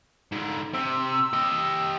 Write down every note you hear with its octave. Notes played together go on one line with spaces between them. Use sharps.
G#2 D3
C3 E6
G4 D#5